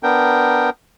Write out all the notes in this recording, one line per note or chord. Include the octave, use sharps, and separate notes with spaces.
B3 D4 A#4 G5